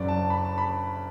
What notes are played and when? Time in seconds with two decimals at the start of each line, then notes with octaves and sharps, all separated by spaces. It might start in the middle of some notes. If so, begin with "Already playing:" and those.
Already playing: F#1 F#2 F#3 D5
0.08 A5
0.30 B5
0.45 A5
0.58 B5